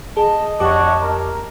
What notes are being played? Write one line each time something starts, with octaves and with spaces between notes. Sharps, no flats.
G#4 D#5 A5
F2 D4 F#4 G4 C#5 A5 D6
A#4